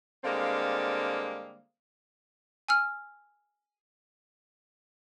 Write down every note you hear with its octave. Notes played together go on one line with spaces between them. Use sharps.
D3 G3 G#3 A#3 C4 F5
G#5 E6 F6